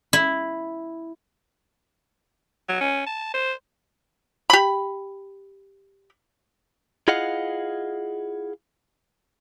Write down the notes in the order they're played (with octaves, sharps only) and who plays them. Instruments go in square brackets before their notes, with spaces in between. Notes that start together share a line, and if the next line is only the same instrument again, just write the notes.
[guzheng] E4
[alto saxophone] F#3
C#4
A5
C5
[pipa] G4 B5
[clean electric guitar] E4 F4 G#4 D#5 F5 F#5